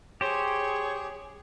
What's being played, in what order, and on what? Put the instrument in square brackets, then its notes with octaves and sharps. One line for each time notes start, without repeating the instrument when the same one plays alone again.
[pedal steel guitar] G4 C5 [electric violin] G#4 [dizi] C#5